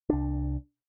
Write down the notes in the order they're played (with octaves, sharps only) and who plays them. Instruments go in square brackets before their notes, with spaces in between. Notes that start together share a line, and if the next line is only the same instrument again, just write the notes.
[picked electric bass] C2 D4